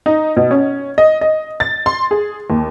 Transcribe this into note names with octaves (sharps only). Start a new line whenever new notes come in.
D#4
B2
C#4
D#5
D#5
A6
C6
G#4
D#2